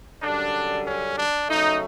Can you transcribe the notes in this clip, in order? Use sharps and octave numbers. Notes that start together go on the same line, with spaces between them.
F#2 D3 G3 D4
C#4
D4
C#3 F#3 A3 D#4